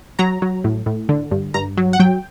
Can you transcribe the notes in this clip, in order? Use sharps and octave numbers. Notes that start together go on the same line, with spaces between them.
F#3 A#5
F#3
A2
A2
D3
G2
G2 A#5
F#3
F#5
F#3 G5